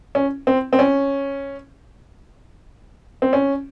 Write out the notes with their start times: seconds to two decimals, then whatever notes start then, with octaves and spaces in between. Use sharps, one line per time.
0.15 C#4
0.47 C4
0.73 C4
0.79 C#4
3.22 C4
3.33 C#4